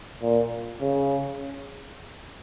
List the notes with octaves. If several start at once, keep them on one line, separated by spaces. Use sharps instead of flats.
A#2
C#3